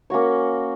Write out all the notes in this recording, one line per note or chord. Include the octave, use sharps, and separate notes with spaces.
A#3 C#4 F#4 C#5